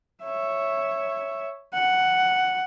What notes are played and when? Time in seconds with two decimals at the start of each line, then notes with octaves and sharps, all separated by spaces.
0.24 C#5 E5
1.74 F#5